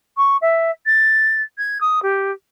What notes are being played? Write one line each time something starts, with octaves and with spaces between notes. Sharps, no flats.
C#6
E5
A6
G#6
D#6
G4